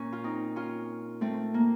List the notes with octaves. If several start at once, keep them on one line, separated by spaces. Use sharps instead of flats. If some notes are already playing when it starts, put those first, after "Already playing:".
Already playing: A#2 C#4
F4
C4 D#4
C#4 F4
A3 C4
A#3